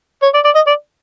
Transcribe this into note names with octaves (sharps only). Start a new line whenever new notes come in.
C#5
D5
D5
D#5
D5